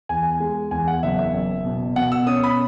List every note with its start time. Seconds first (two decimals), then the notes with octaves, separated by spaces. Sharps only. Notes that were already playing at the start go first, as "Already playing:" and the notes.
0.09 E2 G#5
0.40 G#3
0.71 E2 G#5
0.88 F#5
1.03 F#1 E5
1.18 E5
1.33 F#1
1.64 B2
1.96 B2 F#5
2.12 E6
2.27 C#4 D#6
2.43 B5